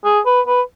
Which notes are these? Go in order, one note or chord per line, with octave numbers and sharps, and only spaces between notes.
G#4
B4
B4